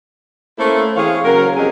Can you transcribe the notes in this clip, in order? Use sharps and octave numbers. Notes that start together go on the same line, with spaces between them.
A3 A#3 C#4 E4 A4 C5
E3 C4 G#4 C#5 F5
C#3 F#3 A#3 A#4
F2 C3 F#3 C#4 G#4 D#5